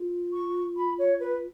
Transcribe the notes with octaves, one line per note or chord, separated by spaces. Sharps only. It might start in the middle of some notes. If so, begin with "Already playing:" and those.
Already playing: F4
C#6
B5
C#5
B4